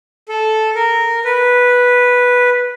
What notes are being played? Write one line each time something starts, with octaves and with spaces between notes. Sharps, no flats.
A4
A#4
B4